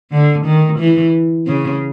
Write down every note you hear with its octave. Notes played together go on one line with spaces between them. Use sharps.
D3
D#3
E3
C#3